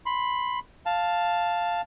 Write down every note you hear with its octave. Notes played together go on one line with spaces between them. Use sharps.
B5 C6
F5 A5